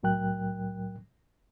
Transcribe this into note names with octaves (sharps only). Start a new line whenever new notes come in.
C2 A2 F#3 A#4 G5 F#6